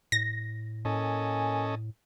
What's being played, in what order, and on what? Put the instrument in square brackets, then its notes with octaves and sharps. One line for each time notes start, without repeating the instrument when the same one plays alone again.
[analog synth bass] A2 [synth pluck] A#6
[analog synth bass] A2 [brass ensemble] A#3 G#5 [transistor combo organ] C#4 A4 D#5